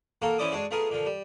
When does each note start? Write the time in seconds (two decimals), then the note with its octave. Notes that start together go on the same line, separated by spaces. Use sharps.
0.22 A#3 F4 F#4 A4 A#4
0.38 E3 C#4 E4 C5 D5 D#6
0.52 G#3 D4 F#4 G#4
0.71 A3 B3 F4 G#4 A#4
0.90 A#2 D3 F3
1.06 G3